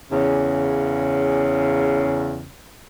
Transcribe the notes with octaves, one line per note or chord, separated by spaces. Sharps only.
E2 C#3